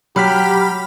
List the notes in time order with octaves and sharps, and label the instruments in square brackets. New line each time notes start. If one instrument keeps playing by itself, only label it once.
[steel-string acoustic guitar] F#3 [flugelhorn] G4 [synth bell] B5 F6 B6